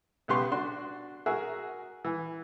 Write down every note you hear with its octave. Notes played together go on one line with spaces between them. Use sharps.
B1 C#3 B3 G4 C6 C#6
D4 F#4 C6
F#4 G#4 A#4 E5
E3